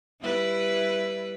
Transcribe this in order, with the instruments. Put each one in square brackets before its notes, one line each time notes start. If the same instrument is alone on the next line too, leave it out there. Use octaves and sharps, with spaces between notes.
[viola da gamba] G3 E4 B4